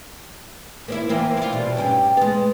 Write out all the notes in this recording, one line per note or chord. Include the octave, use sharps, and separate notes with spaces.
A#3 C4 E4
E3 A#3 C4
E4 F4
B2 G3
G2 C#4 G4
G#3 B3